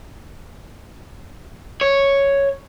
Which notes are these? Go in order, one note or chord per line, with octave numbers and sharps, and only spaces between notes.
C#5